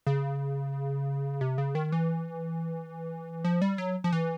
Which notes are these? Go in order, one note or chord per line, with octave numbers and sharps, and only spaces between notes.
C#3
C3
C#3
D#3
E3
F3
G3
F#3
F3
E3